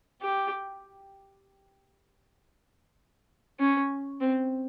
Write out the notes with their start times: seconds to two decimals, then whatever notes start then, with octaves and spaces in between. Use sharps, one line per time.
0.22 G4
3.59 C#4
4.21 C4